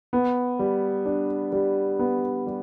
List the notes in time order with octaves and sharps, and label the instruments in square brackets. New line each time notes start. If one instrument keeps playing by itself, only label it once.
[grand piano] B3
G3
D4
G3
B3
G3